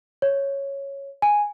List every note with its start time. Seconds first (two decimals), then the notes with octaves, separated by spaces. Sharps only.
0.22 C#5
1.22 G#5